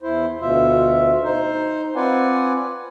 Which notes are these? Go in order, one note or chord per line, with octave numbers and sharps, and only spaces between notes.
E2 E4 C5
D2 B2 F4 E5
D#4 C5
C4 F4 B4 D5 F#5 G#5